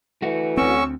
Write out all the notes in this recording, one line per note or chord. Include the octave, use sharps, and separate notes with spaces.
E3 A3 F#4
D2 C4 C#4 C#6 E6